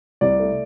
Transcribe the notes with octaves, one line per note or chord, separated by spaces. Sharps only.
C2 D5
A3